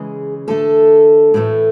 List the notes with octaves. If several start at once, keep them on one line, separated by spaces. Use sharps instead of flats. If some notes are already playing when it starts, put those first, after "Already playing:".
Already playing: C#3 E3 G#3 G#4
D3 A3 A4
A2 E3 A3